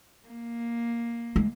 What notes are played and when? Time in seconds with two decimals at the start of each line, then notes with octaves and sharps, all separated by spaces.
0.28 A#3
1.36 G#3